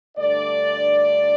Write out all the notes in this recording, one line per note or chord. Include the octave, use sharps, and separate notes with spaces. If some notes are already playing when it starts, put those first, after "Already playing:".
G2 D3 A3 D5